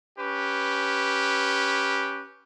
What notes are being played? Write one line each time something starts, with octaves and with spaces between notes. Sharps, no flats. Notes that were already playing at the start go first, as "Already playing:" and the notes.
C#4 G4 B4